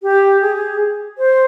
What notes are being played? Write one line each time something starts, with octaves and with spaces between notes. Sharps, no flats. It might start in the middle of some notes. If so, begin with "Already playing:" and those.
G4
G#4
C5